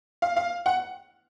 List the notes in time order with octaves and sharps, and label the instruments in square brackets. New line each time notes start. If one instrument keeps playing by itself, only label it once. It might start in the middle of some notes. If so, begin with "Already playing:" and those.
[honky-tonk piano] F5
F5
F#5